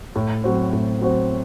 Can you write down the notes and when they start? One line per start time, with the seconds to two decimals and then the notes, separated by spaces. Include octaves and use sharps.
0.16 A2
0.44 F#3 C4 F#4 C5
0.73 A2
1.01 F#3 C4 F#4 C5